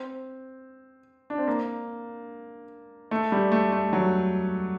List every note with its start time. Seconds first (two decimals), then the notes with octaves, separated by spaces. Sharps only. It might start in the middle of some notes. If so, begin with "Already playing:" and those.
Already playing: C4
1.30 D4
1.38 C4
1.47 A#3
3.11 A3
3.32 G3
3.52 A3
3.72 A3
3.93 F#3